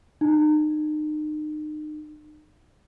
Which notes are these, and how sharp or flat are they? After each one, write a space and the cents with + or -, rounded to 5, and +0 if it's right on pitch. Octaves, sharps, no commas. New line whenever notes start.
D#4 -35